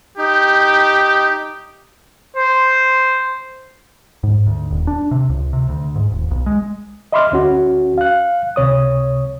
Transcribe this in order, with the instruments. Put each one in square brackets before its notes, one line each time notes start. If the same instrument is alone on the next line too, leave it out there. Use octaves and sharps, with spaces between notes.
[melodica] D#4 [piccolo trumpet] G4
[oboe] C5
[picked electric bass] G#2
D2
D#1
D4
C3
C#2
C3
D2
G#2
D#1
B1
G#3
[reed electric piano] D#5 E5 B5 C6 D6 F6
D2 C#4 F#4
F5 F#6
C#2 C3 C#5 D#6